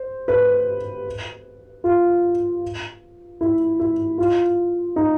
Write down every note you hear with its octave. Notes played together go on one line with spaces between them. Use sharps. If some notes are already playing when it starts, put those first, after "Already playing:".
Already playing: C5
B4
F4
E4
E4
F4
D#4